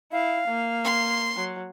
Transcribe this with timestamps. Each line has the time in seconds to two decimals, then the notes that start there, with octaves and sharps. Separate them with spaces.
0.12 E4 F5
0.48 A#3
0.84 C6
1.37 F#3